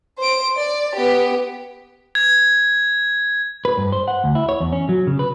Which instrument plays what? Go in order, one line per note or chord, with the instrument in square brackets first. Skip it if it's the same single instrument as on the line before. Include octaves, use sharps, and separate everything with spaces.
[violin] C5 D7
D5
B3 G4
[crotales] G#6
[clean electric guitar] B4
G2
C5
F#5
D2
E4
C#5
E2
C#4
F#3
C#3
B4